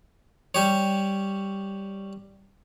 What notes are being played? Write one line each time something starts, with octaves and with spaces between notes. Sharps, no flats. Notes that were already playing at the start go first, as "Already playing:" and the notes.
G3 G4 C#5